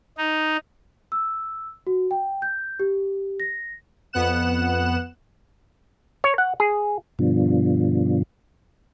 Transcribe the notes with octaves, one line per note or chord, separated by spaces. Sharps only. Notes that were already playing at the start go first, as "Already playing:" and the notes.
D#4
E6
F#4
G5
G6
G4
A#6
F2 B3 F#5 F#6 E7
C#5
F#5
G#4
G2 B2 D3 F3